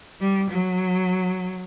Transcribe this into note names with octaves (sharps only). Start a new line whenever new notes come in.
G3
F#3